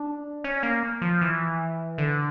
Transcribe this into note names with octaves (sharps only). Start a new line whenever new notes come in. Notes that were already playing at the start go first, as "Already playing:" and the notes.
Already playing: D4
C#4
A#3
F3
E3
D3